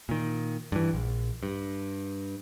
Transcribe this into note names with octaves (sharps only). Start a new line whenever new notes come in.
A#2 D#3
G2 E3
A#1
G2